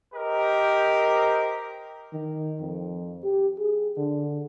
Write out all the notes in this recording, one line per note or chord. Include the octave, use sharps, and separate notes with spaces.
G4 A#4 C5 D#5
D#3
F2
G4
G#4
D3